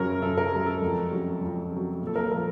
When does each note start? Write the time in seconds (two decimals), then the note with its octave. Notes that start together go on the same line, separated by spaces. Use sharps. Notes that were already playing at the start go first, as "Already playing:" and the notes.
Already playing: F#2 C#3 F#3 A#4 C#5
0.22 F#2 A4
0.38 A#4
0.52 C#3 F#3
0.66 A4
0.82 F2
1.11 C#3 F#3
1.41 F2
1.71 C#3
1.76 F#3
2.01 A#2
2.07 A4
2.16 A#4
2.31 F3 A#4